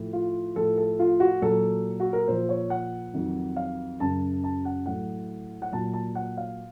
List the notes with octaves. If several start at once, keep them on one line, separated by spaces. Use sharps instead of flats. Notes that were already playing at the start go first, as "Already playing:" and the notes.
Already playing: A2 F3
F4
A2 F3 A4
A4
F4
F#4
A#2 F#3 A4
F#4
A#4
A#2 F3 C5
C#5
F#5
F2 D#3 F#3
F5
F#2 C#3 F#3 A5
A5
F#5
A2 F#3 F#5
F#5
A#2 F#3 A5
A5
F#5
F5